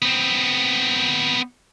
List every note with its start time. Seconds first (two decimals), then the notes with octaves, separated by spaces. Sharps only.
0.02 B3 C4